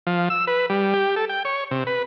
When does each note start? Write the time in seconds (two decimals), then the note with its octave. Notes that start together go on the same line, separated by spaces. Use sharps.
0.07 F3
0.30 E6
0.47 B4
0.70 G3
0.94 G4
1.16 A4
1.29 G5
1.45 C#5
1.71 C3
1.87 B4